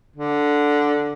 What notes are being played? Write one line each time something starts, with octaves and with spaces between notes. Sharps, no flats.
D3